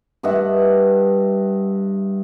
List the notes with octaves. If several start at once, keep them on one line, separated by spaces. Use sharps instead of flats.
G2 D#5 E5 F#5